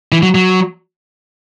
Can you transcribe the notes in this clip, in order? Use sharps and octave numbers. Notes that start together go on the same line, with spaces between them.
E3
F#3
F#3